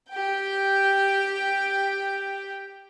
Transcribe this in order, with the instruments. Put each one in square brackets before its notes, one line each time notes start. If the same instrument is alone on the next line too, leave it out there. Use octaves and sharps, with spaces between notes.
[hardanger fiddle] G4 G5